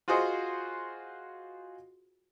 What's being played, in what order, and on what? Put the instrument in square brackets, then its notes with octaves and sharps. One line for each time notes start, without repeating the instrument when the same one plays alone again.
[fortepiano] F4 F#4 G#4 C5 D#5 F#5